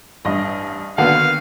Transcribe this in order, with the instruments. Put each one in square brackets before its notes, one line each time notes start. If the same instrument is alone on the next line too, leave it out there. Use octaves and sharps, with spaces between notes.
[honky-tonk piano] A1 G2 [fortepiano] D#5
[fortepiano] D3 B3 F#4 [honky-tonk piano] D#3 A#3 B4 [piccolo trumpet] F5